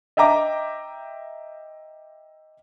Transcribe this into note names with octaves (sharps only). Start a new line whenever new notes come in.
D#5 E5 G5 A#5 D6